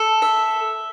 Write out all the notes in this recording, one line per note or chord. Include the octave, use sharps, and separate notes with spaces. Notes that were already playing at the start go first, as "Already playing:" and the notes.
Already playing: A4
E5